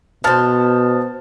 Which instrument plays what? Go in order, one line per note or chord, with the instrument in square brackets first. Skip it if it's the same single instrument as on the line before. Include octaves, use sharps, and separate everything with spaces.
[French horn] B2 [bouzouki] B3 C5 [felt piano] A5 F6 A6